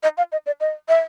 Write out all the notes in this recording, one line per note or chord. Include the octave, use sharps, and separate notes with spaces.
D#5
F5
D#5
D5
D#5
E5